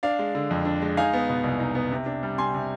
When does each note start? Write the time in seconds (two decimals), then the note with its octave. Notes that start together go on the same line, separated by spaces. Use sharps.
0.03 D4 D5 F5
0.19 G#3
0.35 D3
0.51 F2
0.65 D4
0.82 G#3
0.97 D#4 F5 G#5
1.13 B3
1.29 B2
1.43 C2
1.60 D#4
1.75 B3
1.92 C3
2.06 D4
2.23 G3
2.38 C3 G#5 C6
2.54 C3